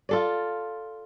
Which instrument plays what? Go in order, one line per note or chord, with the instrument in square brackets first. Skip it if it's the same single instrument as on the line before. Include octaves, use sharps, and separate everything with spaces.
[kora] F4 A4 D5